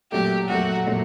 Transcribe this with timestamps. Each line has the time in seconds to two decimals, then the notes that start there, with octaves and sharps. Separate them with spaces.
0.12 A#2 F#3 A3 G4
0.49 A#2 F#3 A3 F#4
0.86 A#2 F#3 A3